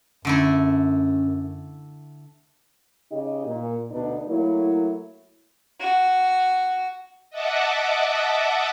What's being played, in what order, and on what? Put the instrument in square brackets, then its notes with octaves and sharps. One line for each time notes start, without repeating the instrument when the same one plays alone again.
[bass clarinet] F#2 [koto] D3 A3 E4
[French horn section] C#3 D#4 G4 D#5
A#2
D2 B2 D4 D#4 B4 D5
F#3 A3 A#3 E4
[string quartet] F#4
[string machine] D#5 E5 F#5 A5 D6